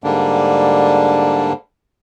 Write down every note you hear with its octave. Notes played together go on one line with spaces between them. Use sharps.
G#2 D3 G3 A#3 D4